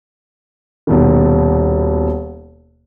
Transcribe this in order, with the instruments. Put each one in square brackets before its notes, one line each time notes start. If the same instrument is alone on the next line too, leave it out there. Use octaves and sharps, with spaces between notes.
[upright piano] D#1 B2 D#3